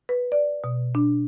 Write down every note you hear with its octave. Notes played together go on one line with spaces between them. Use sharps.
B4
D5
B2
D4